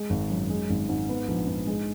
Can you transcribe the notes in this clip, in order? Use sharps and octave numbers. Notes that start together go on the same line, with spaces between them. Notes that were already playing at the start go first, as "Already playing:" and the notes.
Already playing: G#3
G#1
F#2
G#3
G#1
G#2
B3
A#1
G#2
G#3